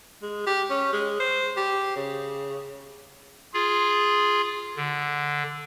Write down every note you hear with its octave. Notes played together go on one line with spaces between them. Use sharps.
G#3
G4
C#4
G#3
C5
G4
C#3
F4 G#4
D3